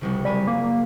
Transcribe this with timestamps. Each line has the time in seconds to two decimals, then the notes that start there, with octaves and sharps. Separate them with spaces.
0.01 F1 C2 C#3
0.25 F#1 G3 G#5 B6
0.47 A#3